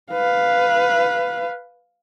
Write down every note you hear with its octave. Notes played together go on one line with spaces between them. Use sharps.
B4 F5